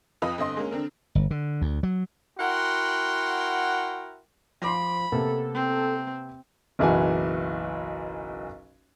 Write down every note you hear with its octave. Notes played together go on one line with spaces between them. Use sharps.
F2 F4 B4 D#5 B5 D#6
G1 C4 D#5 C6
G#3 A#3 C#4
D3 C4 D4 A#4
G1
D3
D2
F#3
E4 F#4 A#4 F#5 G5 C6
F3 B5 C6 D6 A#6
C3 A#3 B3 A4
C4
F#1 B1 E3 F#4 G#5